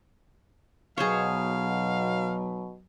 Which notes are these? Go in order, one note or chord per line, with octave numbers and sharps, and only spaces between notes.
B1 B2 F#3 G#4 C5 C#5 F5